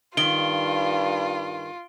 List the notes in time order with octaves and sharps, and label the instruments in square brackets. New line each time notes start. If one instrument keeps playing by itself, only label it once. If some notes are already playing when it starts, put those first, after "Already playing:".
[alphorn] G2 [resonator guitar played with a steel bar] D#3 [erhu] F4 [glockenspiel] D7 G7